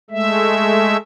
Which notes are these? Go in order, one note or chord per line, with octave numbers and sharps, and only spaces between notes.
G#3 A3 E5